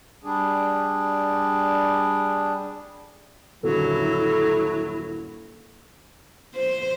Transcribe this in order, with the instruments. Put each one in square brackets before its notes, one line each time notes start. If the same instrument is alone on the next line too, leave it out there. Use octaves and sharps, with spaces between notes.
[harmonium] G3 D4 G#4
[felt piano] D#1 F#2 D3 [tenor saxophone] F#3 [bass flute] E4 [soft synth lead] A4
[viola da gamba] C5